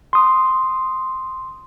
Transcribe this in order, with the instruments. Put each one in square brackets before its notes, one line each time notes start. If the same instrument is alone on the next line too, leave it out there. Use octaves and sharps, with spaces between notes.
[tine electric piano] C6 D#6